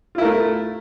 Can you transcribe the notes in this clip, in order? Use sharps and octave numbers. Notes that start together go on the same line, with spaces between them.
A3 E4 F4 A#4